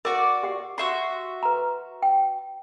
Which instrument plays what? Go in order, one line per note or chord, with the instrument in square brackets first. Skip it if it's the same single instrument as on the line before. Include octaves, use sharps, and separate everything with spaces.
[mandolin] F#4 D5 [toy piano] A#4
[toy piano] G4 F#5
[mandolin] F#4 E5 C6
[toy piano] B4 A#5
G5